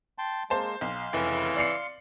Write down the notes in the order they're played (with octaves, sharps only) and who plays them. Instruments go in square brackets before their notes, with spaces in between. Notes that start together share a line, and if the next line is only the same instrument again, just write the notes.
[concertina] G5 A5 C6
[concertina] G#3 A#3 [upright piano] C5 A5
[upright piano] B1 [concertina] F5 C6
[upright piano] F1 [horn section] C#3 E3
[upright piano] D5 C7 C#7